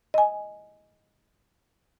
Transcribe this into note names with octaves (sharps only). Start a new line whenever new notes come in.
D#5 G#5